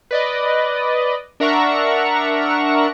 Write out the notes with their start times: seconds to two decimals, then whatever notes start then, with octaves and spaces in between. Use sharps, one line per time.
0.11 B4 D5 D#5
1.40 D4 A#4 E5 F#5 A#5 C#6